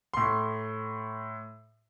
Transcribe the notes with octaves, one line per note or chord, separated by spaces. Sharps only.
A2 C6